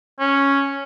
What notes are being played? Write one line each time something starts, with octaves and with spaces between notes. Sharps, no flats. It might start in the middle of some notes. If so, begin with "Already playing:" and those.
C#4